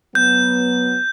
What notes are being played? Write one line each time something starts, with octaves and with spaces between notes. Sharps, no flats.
F#3 B3 G6